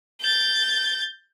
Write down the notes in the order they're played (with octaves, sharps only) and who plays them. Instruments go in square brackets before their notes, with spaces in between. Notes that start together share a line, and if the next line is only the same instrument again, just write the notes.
[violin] G6 A6